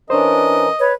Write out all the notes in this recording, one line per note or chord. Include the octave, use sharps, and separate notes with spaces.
E3 C#4 D4 A#4 C5 C#5 D#5
B4 C#5